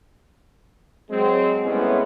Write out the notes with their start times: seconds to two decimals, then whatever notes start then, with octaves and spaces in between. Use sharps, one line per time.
1.10 F#3 G#3 C4
1.65 A2 G3 G#3 B3 C#4 E4